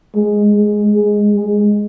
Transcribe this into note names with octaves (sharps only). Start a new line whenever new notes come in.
G#3
G#3
G#3
G#3